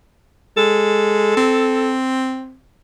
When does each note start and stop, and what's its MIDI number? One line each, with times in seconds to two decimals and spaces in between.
0.57 1.36 56
0.57 1.95 69
1.37 2.57 60